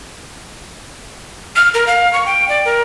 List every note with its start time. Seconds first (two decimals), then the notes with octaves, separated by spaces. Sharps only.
1.56 F6
1.74 A#4
1.87 F5
2.13 C#6
2.26 G5
2.49 D5
2.65 A#4